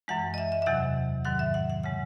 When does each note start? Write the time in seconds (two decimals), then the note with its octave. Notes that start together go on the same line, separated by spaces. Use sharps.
0.08 F#2 E3 G#3 F#5
0.34 D#5
0.38 E5
0.52 E5
0.62 E5
0.66 E2 C3 F#3 F#5
1.25 G#2 D#3 F#3 F#5
1.39 E5
1.54 F#5
1.70 F#5
1.83 C#3 G#3 F#5